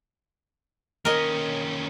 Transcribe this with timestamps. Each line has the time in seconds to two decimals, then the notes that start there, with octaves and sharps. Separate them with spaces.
1.05 D#2 C#4 A#4 D#5